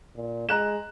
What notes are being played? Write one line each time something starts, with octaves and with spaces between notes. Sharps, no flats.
A#2
G#3 A#5 F#6 E7